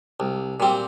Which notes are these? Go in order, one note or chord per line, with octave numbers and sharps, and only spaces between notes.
C2
A#2 G3 C4